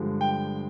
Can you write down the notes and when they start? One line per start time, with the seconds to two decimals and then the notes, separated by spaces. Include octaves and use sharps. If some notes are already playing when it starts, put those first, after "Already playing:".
Already playing: G2 D3 F3 G#3
0.21 G5